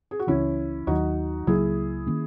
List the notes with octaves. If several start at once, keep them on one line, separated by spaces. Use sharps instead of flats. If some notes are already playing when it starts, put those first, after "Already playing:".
G#4
F#4
C#2 C#3 E3 C#4 E4
D#2 D#3 F#3 D#4 F#4
C#2 C#3 F#3 A#3 E4 G#4
D#3 A#3 C#4